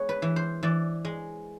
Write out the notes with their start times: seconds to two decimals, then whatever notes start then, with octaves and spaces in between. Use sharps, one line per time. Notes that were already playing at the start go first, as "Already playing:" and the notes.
Already playing: G#3 B3 C#5
0.09 B4
0.22 E3
0.36 C5
0.63 E3 D5
1.05 G#3